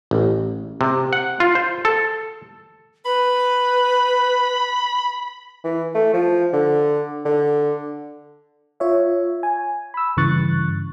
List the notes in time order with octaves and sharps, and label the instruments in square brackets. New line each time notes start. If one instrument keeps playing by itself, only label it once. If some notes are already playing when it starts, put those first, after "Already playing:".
[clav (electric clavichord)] A1
C3
F#5
F4
C5
A4
[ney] B4 [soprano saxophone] B5
[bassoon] E3
A3
F3
D3
D3
[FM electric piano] F4 C#5 E5
G#5
B5 E6
G2 C#3 E3 C#6 F#6 A6